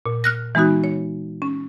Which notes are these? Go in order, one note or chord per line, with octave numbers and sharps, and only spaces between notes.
A#2
F6 F#6 A#6
E3 G#3 B3 D#4 F#4
C#5
C#4